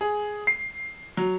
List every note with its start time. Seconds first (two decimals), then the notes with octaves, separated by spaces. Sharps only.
0.01 G#4
0.47 C7
1.17 F#3